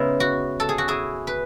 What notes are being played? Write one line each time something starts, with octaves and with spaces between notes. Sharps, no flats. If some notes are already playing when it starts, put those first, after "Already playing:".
Already playing: C#3 G#3 B3 D#4 E4
F#4
A4
G#4
F#4
E4 G#4
B4